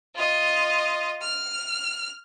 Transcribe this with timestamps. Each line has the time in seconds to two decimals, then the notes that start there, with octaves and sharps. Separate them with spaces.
0.14 F4 D#5
1.21 F6